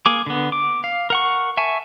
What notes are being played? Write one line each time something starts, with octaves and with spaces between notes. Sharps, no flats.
A#3 G#4 D6
D3 B3
D6
F5
A#4 F#5 C#6
E5 G#5 A5 C#6